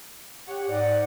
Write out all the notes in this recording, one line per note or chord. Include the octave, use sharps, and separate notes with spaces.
G4 C#5 F#5
G#2 D5 F#5